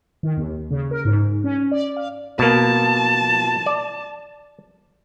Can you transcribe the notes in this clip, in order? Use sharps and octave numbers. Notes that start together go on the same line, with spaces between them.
D#3
D#2
C#3
A#4
G#2
C#4
D5
F5
B2 A#3 A5
D5